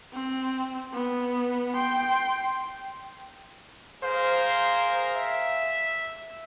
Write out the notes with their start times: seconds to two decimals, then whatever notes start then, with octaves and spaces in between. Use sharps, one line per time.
0.13 C4
0.93 B3
1.74 G5 C6
4.03 G#4 A#4 C5 F5
5.16 E5